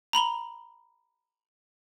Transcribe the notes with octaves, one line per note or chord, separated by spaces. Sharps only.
A#5 B5 F7 G7